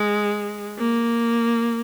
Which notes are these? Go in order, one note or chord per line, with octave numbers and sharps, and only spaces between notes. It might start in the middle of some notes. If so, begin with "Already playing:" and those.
Already playing: G#3
A#3